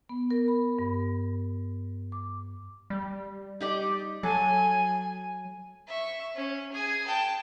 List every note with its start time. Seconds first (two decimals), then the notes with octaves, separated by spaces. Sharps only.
0.09 B3
0.31 A#4
0.48 B5
0.79 G2
2.12 D6
2.90 G3
3.60 D#4 G4 D5
4.23 F#3 A4 G#5
5.87 E5 C#6
6.35 C#4
6.72 G#4 G#5
7.06 G5 A5